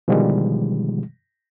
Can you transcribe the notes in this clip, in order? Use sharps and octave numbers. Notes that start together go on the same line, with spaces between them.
B2 D3 D#3 F3 G3 G#3